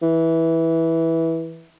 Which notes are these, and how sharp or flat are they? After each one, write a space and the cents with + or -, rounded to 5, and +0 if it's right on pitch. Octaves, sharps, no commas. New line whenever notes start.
E3 -10